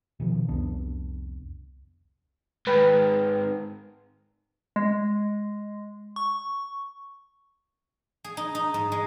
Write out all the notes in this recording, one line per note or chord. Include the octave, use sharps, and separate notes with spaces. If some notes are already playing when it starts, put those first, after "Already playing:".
B2 D#3 F3
C2 F2 B3 D4
G#2 D#3 B4 G5
G#3
C#6
G#4
D#4
D#4
G#2
G#3